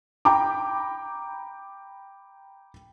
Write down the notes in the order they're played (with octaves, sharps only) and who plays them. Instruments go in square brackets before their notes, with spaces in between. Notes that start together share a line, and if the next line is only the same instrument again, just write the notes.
[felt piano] G5 A#5 B5 D6